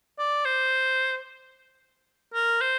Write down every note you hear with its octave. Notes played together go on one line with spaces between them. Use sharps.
D5
C5
A#4
C5